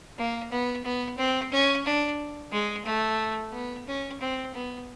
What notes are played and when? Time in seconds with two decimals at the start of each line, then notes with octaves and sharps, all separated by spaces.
0.18 A#3
0.51 B3
0.84 B3
1.18 C4
1.52 C#4
1.85 D4
2.52 G#3
2.85 A3
3.53 B3
3.87 C#4
4.21 C4
4.54 B3